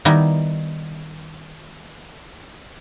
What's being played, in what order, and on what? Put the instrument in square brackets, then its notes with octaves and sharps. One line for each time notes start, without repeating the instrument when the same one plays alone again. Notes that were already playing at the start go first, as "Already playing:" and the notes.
[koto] D#3 G3 B3 D#4 E4